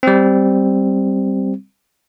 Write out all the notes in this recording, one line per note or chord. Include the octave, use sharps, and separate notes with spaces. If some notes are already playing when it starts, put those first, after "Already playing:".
G3 C4